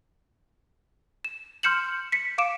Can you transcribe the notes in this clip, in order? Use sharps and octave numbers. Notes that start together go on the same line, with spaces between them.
E7
C6 F6 G6 C#7 E7 F#7
B6 C#7
F5 D6 D7 E7